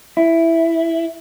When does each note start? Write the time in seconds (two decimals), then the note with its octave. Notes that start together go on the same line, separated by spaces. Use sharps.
0.17 E4